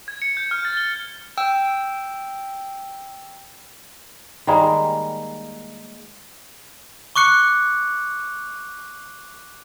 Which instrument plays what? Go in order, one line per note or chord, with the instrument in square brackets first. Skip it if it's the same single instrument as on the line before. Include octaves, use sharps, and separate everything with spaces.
[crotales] G#6
C#7
G6
F6
A6
G7
[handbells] G5 E6
[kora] D#3 G3 G#3 A#3
[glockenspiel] C#6 D6 F#6 C#7